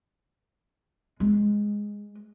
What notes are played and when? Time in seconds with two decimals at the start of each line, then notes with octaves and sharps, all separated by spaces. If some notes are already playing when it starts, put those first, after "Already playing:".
1.20 G#3